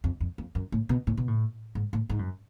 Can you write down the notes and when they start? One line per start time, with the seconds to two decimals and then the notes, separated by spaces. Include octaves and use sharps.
0.04 F2
0.20 F2
0.38 F2
0.55 F#2
0.72 A2
0.89 B2
1.07 A2
1.17 B2
1.28 A2
1.75 G#2
1.93 A2
2.09 G#2
2.19 F#2